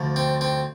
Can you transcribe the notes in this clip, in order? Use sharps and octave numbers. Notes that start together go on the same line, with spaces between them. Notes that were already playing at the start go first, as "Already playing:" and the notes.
Already playing: D2 D3 F3
C4
C4